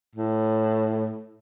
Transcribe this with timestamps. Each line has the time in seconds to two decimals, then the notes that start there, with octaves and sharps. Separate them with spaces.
0.16 A2